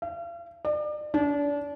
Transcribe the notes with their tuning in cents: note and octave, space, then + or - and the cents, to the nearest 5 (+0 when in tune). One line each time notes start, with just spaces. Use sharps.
F5 -40
D5 +35
D4 -30